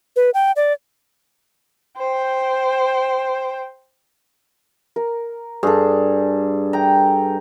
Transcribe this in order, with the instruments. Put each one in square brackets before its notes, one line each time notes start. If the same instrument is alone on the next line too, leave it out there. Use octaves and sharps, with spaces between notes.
[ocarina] B4
G5
D5
[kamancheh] C5 G5
[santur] A#4
[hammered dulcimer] G2 [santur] G#4 A4
[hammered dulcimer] G5 A#5